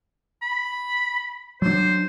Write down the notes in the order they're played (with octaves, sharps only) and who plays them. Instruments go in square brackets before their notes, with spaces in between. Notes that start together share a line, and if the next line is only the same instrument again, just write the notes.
[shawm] B5
[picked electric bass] F#3 D4 [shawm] C5